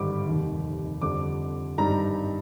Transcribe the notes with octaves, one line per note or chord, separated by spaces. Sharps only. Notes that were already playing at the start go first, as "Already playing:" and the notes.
Already playing: G#1 G2 D3 G3 D6
F1 D#2 D#3 G3
F2 D3 G3 D6
G#1 G2 D#3 G3 A#5